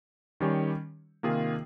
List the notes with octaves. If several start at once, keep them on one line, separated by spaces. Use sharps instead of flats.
D#3 G3 C#4 G4 C#5
C3 D#3 A#3 F4 G#4